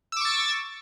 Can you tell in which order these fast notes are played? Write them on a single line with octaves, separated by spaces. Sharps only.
E6 D6 C#6 A6